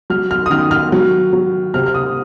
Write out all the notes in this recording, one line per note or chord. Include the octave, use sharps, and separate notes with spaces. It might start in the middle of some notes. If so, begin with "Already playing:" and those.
F#3 F6
F6
D#6
D#3 F6
F6
F#3
F#3
C3 F6
F6
D#6